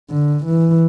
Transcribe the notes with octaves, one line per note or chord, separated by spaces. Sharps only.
D3
E3